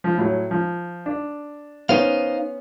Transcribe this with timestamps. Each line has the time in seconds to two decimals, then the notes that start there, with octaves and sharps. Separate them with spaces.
0.04 F3
0.18 A2 F#3
0.51 F3
1.06 D4
1.89 B3 C#4 D#4 C5 F5